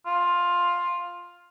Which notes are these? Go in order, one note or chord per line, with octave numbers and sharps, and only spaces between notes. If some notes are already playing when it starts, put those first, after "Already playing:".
F4